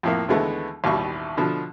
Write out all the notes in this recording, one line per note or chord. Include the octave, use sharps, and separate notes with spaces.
F2 A2 A#3
D#2 D3 E3 G#3 A3 B3
A1 D#2 B2 G3 C#6
B2 D3 F3